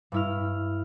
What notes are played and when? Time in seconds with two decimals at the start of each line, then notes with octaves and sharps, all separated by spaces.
0.12 G2 E4 F6